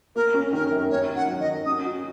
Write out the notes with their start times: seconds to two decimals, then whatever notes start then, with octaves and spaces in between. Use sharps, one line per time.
0.16 A#3 A#4
0.34 C#4
0.53 D#3 A#4
0.72 F#2
0.90 A#3 C#5
1.10 D#3
1.16 F#5
1.28 F#3
1.40 D#5
1.47 D#3
1.66 C#4 D#6
1.85 F#4